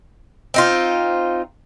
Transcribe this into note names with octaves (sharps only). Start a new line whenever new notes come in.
C4 D#4 F4